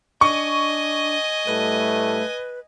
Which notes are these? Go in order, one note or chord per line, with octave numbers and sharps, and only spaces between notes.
D4 D#5 G#5 C#6
A2 G3 A3 B4